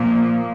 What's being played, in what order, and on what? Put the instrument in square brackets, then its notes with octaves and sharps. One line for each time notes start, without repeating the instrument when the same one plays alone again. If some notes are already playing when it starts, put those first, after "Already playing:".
Already playing: [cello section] A#2 F3 A#3